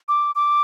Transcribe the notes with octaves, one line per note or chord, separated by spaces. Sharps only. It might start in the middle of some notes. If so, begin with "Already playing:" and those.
D6
D6